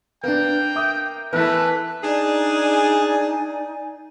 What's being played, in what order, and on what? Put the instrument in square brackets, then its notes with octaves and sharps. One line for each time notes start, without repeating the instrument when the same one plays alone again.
[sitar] A#3 [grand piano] B3 D4 [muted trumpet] G5
[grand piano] E5 D6 D#6
[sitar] E3 A3 [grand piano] B3 E4 [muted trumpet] B4
[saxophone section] D4 G#4 [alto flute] D#4 [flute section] D5 G#5